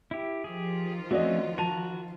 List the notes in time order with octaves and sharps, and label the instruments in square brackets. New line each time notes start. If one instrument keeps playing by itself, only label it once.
[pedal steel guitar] E4 G4
[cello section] D#3 F3 F4 [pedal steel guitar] G4 G#4
[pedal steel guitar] A3 C4 C#4 [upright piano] F#4 D5 D#5
[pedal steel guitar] F#4 A#5 [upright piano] A5 D#7